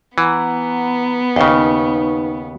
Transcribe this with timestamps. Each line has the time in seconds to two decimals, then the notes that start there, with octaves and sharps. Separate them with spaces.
0.18 E3 B3 F#5 A#5
1.36 D#2 C#3 D#4 B4 C#6